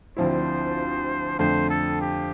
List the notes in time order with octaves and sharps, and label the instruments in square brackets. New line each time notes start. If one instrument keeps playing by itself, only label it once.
[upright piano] D2 D3 F3 C4 E4 [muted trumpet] C5
[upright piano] F2 D3 A3 [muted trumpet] C5
[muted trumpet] A4
G4